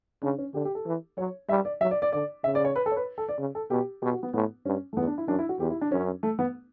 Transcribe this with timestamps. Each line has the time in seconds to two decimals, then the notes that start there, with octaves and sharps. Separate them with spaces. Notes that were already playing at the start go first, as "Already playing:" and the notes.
0.23 C#3 D4
0.38 C#4
0.54 D3 G4
0.65 G4
0.75 A4
0.86 E3
1.18 F#3 C#5
1.49 G3 E5
1.65 D5
1.81 F#3 E5
1.91 D5
2.02 D5
2.12 D3 D5
2.44 C#3 E5
2.55 D5
2.65 C#5
2.76 B4
2.86 A4
2.92 C#5
2.96 B4
3.18 A4
3.29 D5
3.39 C#3
3.55 A4
3.70 B2 G4
4.02 B2 G4
4.12 F#4
4.23 B3
4.34 A2 B3
4.65 G2 C#4
4.93 A3
4.97 E2 B3
5.07 D4
5.18 E4
5.28 F#2 D4
5.39 E4
5.49 F#4
5.60 E2 G4
5.70 E4
5.81 D4
5.91 F#2 C#4
6.23 A3
6.39 B3